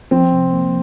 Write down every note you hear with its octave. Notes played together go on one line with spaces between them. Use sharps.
F3 C4
C3
A#3